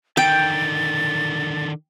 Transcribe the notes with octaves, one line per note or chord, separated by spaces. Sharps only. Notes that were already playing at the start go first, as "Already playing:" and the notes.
D3 D#3 G5 A6